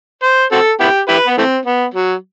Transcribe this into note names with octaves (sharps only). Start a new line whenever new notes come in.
C5
C4 F#4 A4
B3 E4 G4
E4 G4 B4
B3
E3 A3 C4
B3
F#3